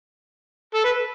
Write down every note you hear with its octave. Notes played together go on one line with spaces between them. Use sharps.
A4
B4